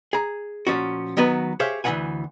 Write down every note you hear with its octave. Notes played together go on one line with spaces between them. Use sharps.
G#4 A#5
A#2 F3 C#4 F#4
D#3 F#3 B3 F#4 B4
G4 G#4 C5 C#5 E5 F5
D2 E3 F#3 G#3 F#5 G#5